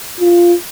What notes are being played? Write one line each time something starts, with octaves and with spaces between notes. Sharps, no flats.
F4